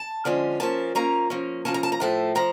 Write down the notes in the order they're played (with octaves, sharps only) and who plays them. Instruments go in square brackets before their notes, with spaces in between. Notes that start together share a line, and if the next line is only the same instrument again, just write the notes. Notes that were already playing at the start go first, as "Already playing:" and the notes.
Already playing: [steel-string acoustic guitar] A5
D3 F3 G#3 C#4
F3 A#3 C#4 A5
F3 A#3 C#4 A#5
F3 A#3 C#4
F3 A#3 C#4 A5
A#5
A5
A#5
A2 F3 A3 A5
F3 A3 A#5